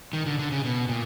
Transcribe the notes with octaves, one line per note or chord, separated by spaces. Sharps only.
D#3
D3
D3
C#3
B2
A#2